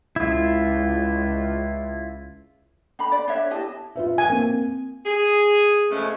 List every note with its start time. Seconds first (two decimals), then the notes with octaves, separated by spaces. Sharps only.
0.16 C#2 E4 F4
2.99 D4 A#5 B5
3.12 D5
3.28 D4 C#5 E5
3.51 E4 G4 D#5 A5
3.96 F4 B4 E5
4.18 G#5
4.30 A#3 C4
5.06 G#4
5.91 B2 F3 G#3 A3 C#4